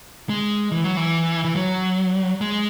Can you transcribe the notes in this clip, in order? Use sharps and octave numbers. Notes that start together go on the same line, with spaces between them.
G#3
E3
F#3
E3
E3
F#3
G#3